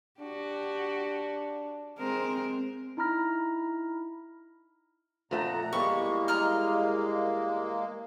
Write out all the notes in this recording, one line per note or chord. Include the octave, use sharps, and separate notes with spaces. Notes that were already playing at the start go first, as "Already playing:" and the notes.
D4 F#4 G4
G#3 C4 A#4 C5
D#4 E4 A#5 B5 F6 A#6
F2 A#2 A3 F#5 A#5
E2 G3 G#3 A#3 C#6
D#5 A#5 F6